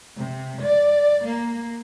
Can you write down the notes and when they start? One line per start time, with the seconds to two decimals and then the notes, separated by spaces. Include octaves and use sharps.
0.18 C3
0.61 D5
1.24 A#3